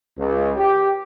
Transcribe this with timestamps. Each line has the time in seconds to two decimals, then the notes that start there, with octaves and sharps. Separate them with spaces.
0.18 C#2
0.57 G4